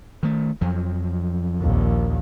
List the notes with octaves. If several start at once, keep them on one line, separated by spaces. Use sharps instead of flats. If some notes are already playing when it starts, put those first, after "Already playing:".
D#3 A3
F2 F3 F#3
A#1 D#2